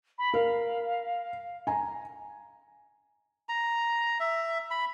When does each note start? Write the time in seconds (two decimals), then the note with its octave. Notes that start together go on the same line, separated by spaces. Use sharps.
0.18 B5
0.34 A#4 F5
1.67 G#5 A#5
3.49 A#5
4.20 E5
4.71 B5